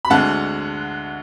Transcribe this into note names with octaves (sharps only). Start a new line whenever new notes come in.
B5
D2 D3 G#3 F#5 A5